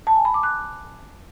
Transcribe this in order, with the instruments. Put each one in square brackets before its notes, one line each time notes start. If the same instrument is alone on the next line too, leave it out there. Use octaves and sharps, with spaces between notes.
[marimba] A5
G#5
B5
D6
F#6